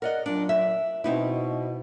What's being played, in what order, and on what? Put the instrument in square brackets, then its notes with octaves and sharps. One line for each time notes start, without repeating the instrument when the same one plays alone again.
[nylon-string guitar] A#4 D5 D#5 [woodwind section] F#5
[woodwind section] A#2 F#3 [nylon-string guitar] D4
[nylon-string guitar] E5
[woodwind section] B2 [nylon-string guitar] C4 D#4 E4